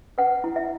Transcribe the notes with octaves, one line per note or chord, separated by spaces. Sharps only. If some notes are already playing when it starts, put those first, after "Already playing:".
B4 F#5
E4
E5